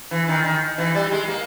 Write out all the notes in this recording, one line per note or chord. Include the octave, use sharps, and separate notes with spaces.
E3
D#3
D#3
E3
G3
G#3
A#3